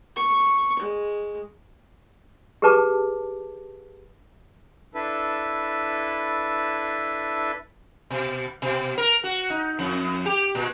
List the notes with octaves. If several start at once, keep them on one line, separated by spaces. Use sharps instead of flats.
C#6
G#3
G4 G#4 A#4 B4 A5 D6
D4 E4 A4 B4
B2
B2
A#4
F#4
D#4
F2
G4
A#2